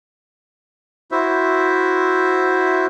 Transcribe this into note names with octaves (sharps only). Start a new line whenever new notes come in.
E4 F#4 C5 E5